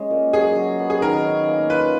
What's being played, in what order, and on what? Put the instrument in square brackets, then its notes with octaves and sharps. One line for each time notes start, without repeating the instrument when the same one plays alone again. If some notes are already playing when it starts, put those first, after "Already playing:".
Already playing: [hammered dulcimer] G#3 C#4
A#2
[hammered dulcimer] F#3 [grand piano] G#4
[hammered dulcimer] F#3
B3
[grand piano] G#4
[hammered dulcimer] D#3 [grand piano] A#4
[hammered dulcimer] C#4
A#3
[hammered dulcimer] F4 [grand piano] B4